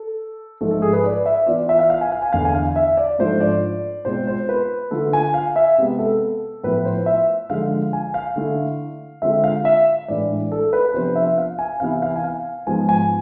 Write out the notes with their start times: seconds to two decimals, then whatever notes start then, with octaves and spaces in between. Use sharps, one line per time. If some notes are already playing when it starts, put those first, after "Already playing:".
Already playing: A4
0.61 G#2 F3 A3 A4
0.71 A4
0.82 G#4
0.93 B4
1.04 D5
1.26 E5
1.46 E3 B3 F4 D5
1.69 E5
1.79 F5
1.90 F5
2.01 G#5
2.12 F5
2.22 G#5
2.33 E2 D3 A3 D4 F5
2.45 G#5
2.55 F5
2.76 E5
2.97 D5
3.19 G#2 F3 A3 D4 F4 C5
3.40 D5
4.05 B2 G#3 C4 F4 C5
4.27 C5
4.49 B4
4.91 D3 A3 D4 F4 A4
5.13 G#5
5.34 F5
5.56 E5
5.78 C3 G#3 B3
5.99 A4
6.63 A2 F3 B3 E4 B4
6.85 C5
7.06 E5
7.50 D3 F3 G#3 F5
7.93 G#5
8.14 F5
8.36 D3 A3 E4
9.22 D3 G#3 C4 F4 E5
9.44 F5
9.65 E5
10.08 A2 E3 G#3 D4 D5
10.52 A4
10.73 B4
10.94 C3 F3 B3 D4 C5
11.16 E5
11.38 F5
11.59 G#5
11.80 C3 E3 B3 E4 F5
12.02 F5
12.16 G#5
12.24 F5
12.66 G#2 F3 G#3 B3 G#5
12.89 G#5